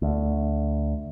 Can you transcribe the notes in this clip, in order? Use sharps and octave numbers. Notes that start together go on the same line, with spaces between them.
D2